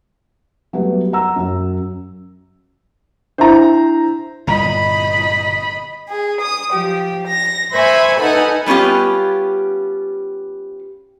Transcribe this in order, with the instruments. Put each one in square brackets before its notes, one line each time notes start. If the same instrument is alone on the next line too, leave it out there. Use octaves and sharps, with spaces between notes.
[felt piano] F#3 G3 A3 B3 G4
F#5 A#5 E6
F#2 F#3
[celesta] D4 E4 [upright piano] C5 E5 A#5
[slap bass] G1 A#2 [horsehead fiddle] D#5 B5
[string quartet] G#4
D#6
F3 G4
A#6
C5 E5 G#5 B5 C#6
D#4 A4 B4 F#5 G#5
[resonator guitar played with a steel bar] G3 B3 C#4 F4 G4